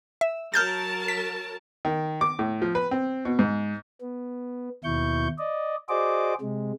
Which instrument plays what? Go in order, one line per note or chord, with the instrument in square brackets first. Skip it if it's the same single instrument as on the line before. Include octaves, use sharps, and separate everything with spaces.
[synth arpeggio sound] E5
[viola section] F#3 A#4 A5 [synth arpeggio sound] F6 G6 A6
[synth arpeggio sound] B6
[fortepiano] D#3
D6
A2
F3
B4
C4
B2
G#2
[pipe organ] B3
D#2 B2 E4 C#6 G6
D5 D#5
F#4 G#4 C5 D5 D#5 D6
C3 G#3